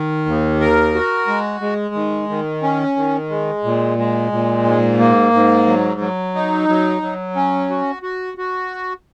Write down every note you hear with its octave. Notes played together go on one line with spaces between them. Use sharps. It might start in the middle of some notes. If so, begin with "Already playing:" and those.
Already playing: D#3
D#2
A#4
F#4
G#3
G#3
D#3
D#3
C#4
D#3
G#3
A#2
G#3
A#2
G#2
A#3
G#2
F#3
F#3
D#4
F#3
F#3
C#4
F#4
F#4
F#4